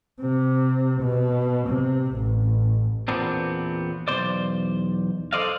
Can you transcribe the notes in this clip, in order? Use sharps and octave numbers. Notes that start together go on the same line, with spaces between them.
C3
B2
C3
A1
E2 A#2 B3 C4 D4
B1 E2 C5 D5
A4 C5 D5 D#5 F5